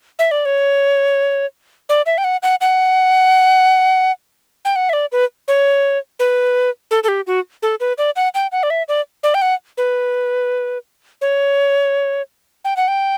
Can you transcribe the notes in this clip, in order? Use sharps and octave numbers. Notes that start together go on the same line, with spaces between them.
E5
D5
C#5
D5
E5
G5
F#5
F#5
F#5
G5
F#5
E5
D5
B4
C#5
B4
A4
A4
G4
F#4
A4
B4
D5
F#5
G5
F#5
D5
E5
D5
D5
G5
F#5
B4
C#5
G5
F#5
G5